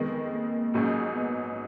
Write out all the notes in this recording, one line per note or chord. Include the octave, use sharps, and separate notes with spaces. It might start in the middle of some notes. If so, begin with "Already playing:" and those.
Already playing: F2 D#3 G#3 B3
A#3
A#1 G#2 F#3 C#4 G#4
B3